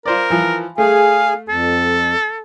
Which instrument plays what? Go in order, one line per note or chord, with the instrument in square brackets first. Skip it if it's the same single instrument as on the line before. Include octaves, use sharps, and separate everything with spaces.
[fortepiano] F4 C5 D5 [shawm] A#4
[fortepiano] E3 F3
[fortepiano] A3 [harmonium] G#4 G#5 [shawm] F5
[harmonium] F2 [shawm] A4